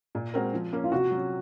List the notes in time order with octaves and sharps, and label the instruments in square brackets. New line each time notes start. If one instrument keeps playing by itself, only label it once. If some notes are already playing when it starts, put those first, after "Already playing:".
[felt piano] A#2
G#3 C4 F#4 A#4
F3
A#3 C#4
[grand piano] F4
[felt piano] C3 [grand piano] F#4
[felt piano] F#3 C#4